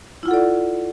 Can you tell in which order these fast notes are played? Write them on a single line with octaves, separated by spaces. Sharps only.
E4 F4 F#5 A4 D5